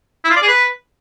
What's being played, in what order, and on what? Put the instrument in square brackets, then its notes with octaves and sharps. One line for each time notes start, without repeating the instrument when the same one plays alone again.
[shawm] E4
F4
D5
G#4
B4